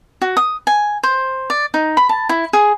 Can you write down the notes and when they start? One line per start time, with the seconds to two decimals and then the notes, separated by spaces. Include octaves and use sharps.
0.22 F#4
0.37 D#6
0.67 G#5
1.03 C5
1.50 D5
1.74 D#4
1.97 B5
2.09 A5
2.29 E4
2.53 G#4